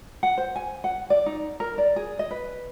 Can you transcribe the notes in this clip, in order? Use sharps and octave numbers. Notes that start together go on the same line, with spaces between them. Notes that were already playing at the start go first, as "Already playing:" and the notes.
F#5
C5
G#5
F#5
D5
D#4
A#4
D5
G#4
D#5
B4